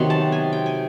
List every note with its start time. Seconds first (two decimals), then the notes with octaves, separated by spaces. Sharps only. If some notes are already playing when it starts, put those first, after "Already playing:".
Already playing: C3 D#3 F#3 B3 C6
0.10 A5
0.32 G#5
0.53 G5
0.66 G#5